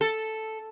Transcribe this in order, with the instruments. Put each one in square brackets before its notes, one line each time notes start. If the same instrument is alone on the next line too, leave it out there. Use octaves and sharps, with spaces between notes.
[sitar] A4